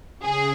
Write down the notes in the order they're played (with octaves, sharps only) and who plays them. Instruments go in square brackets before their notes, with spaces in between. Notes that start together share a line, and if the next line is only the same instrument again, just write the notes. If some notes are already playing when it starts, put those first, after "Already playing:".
[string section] C#3 G#4